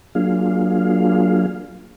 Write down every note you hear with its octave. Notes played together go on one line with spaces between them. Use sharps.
F#3 A#3 D4 F4 G#4 F5